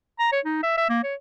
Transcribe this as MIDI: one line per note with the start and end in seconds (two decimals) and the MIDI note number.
0.19 0.29 82
0.32 0.40 73
0.45 0.60 63
0.63 0.73 76
0.78 0.89 76
0.89 1.01 58
1.03 1.15 73